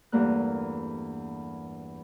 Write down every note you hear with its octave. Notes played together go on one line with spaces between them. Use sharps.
E2 G2 A3 A#3 A#4 F#6